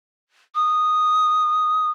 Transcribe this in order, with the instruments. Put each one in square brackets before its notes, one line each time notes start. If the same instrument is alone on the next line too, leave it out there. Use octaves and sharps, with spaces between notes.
[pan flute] D#6